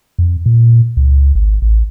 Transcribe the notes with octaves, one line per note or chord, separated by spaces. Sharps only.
F2
A#2
C#2
G#1
A1